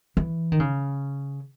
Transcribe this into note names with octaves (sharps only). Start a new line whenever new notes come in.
E3
D#3
C#3